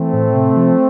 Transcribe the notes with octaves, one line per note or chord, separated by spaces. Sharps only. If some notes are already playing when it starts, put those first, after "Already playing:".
Already playing: E3 A3 C4
A2
C3
F3